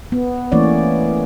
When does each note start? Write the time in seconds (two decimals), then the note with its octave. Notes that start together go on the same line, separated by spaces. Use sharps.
0.12 B3
0.52 E3 A3 A#3 C#4 C#5 D5